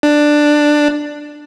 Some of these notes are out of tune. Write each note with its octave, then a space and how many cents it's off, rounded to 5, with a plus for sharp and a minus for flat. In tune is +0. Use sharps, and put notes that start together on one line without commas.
D4 +10